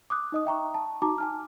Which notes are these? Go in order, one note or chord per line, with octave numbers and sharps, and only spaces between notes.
D6 D#6 F#6
D#4 D#5 D#6
E5 G5 A#5 C#6
A5
D#4 F#4 A5 A#5 D6
G#5 A5 F6